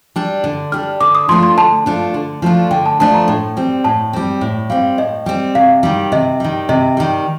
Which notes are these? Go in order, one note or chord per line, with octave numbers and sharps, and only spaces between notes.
G3 D4
D3
G3 D4 F6
D3 D6
D#6
F3 A3 D4 F4 C6
C6
D3 A5
F3 A3 D4 F4
D3
F3 A3 D4 F4
D3 G5
A5
F3 A3 D4 F4 A5
A#5
A2
G3 C4
A2 A5
G3 C4
A2
G3 C4 F5
A2 D#5
G3 C4
C3 F5
D#3 G3
C3 D#5
D#3 G3
C3 D#5
D#3 G3